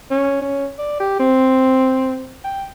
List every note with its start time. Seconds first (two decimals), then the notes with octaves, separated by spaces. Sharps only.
0.11 C#4
0.42 C#4
0.79 D5
1.00 G4
1.19 C4
2.44 G5